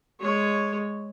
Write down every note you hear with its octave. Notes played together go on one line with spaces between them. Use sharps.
G#3 C#5